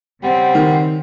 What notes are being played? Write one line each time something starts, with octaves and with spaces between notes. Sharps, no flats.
C#3 G3 C4 C5 F#5
D#3